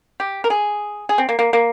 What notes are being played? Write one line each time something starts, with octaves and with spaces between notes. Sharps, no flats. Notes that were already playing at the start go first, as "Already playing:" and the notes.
G4
A#4
G#4
G#4
C4
A#3
A#3
A#3